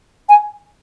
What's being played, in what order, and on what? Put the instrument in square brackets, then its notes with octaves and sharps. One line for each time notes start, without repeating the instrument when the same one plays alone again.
[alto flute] G#5